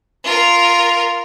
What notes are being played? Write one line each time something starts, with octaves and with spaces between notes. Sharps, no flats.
F4 A#4